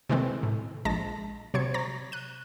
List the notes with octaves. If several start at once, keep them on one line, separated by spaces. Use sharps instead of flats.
C3 D#3 E3 G#3 A3 C4
A2
A#1 G#3 A5 A#6
C3 F#3 C5 C#5 G#6 C#7
C#5 A#5 A6 A#6
F#6 D#7